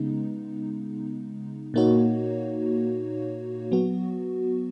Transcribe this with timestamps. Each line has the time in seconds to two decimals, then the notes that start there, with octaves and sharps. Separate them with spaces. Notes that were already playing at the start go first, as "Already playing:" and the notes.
Already playing: C#3 G#3 B3 D#4
1.74 A#2 A#3 D#4 F#4 C#5
3.72 F#3 B3 F#4